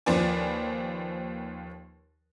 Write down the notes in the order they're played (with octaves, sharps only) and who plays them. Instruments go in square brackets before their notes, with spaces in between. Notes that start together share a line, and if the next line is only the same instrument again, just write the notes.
[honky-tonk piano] D#2 F3 B4 D5 G#5